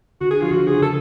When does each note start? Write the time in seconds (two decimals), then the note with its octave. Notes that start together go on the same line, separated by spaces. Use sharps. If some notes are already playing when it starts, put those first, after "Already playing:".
0.21 D3 F#4
0.31 G#4
0.41 F3 F4
0.51 D3 F#4
0.66 C#3 G#4
0.81 D3 A4